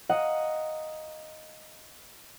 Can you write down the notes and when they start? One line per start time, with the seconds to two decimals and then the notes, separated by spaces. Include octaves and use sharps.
0.09 D#5 F5 F#5 A#5